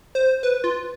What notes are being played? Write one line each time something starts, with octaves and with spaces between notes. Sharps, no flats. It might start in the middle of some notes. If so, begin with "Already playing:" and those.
C5
B4
F4